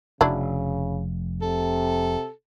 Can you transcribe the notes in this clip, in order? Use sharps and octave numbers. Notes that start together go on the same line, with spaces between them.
F1 C#3 F#3 D4 E4
C3 A4